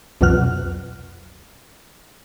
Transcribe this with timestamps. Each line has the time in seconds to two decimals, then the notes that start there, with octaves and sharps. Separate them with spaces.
0.21 C2 F2 B2 F#3 F6 F#6